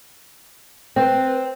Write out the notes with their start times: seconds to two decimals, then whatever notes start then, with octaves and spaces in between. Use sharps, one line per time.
0.96 C4 B4